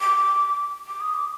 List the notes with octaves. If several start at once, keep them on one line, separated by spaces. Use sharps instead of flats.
D6
D6
D#6
D6